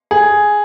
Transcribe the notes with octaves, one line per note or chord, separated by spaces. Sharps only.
G#4